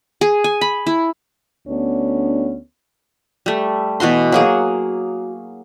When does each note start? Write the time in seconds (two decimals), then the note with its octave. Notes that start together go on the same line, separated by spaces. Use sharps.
0.21 G#4
0.44 G#5
0.61 B5
0.87 E4
1.67 D2 B3 C#4 D4
3.46 G3 A3
4.00 B2 E3 F#4 C6
4.32 F#3 A#3 G#4